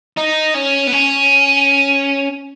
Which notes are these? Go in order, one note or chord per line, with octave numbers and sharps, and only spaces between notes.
D#4
C#4
B3
C#4